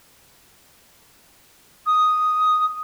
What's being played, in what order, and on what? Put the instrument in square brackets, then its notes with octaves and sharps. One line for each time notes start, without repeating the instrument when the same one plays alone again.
[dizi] D#6